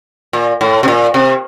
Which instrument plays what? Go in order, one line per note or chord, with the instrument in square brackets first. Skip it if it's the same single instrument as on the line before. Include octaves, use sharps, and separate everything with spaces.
[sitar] A#2
A2
C3
A#2
C3